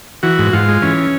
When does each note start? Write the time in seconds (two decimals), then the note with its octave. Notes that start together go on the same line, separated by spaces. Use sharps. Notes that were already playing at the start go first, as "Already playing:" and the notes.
0.23 E3 F#4
0.39 G#2
0.53 G#2 F4
0.69 G#3
0.82 E3 C#4